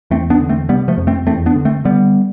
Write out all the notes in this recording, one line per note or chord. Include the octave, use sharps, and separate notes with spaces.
E2 A3 C4
B3 D4
D3
A3 C4
C3 G3 B3
F3 A3
F2
A3 C4
E2 A3 C4
B3 D4
D3
A3 C4
D3 G3 B3